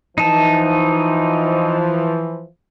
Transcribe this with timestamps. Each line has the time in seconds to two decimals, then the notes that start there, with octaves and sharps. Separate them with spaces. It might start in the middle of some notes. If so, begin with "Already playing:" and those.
0.18 E3 F3 D#4 A5